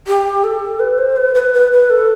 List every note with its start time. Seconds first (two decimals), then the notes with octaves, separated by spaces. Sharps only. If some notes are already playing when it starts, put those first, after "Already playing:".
0.07 G4
0.44 A4
0.80 B4
0.98 C5
1.17 B4
1.35 B4
1.53 B4
1.72 B4
1.90 A4